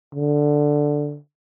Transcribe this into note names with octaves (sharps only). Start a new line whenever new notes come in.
D3